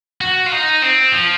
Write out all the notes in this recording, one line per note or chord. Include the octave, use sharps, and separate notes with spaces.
F#4
F4
D#4
C4
F3